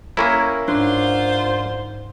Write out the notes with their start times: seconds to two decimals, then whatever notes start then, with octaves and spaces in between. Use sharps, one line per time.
0.17 A#3 C#4 E4 A#4
0.68 G#2 D4 F4 C5